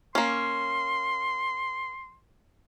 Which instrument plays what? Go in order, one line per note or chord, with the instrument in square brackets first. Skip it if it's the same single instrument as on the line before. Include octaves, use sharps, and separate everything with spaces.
[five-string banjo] A#3 C#4 [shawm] C6